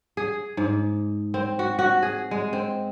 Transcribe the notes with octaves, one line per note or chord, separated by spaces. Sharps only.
G#4
G#2
C4
F#4
F#4
G#4
G#3
C4